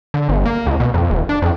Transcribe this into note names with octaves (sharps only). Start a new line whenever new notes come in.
D3
G1
A#3
C#2
B2
F2
D#1
D4
F2